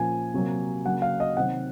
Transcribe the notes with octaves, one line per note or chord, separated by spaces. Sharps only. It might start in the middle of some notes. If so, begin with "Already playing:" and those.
Already playing: A#2 F3 A#3 C#4 G#5
C3 F#3 A#3
C#3 F#3 A#3 C#4 F#5
F5
D#5
C3 D#3 F#3 C4 F#5